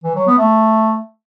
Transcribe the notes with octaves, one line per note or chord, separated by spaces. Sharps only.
E3
F#3
B3
A3